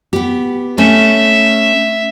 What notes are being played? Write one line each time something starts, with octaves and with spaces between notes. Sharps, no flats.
B3 G4
A3 C#4 E5 G#5